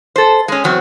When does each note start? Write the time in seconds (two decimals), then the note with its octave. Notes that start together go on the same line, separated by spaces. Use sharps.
0.16 A4 C5
0.48 G#3 C#4
0.64 E2 F#3 C4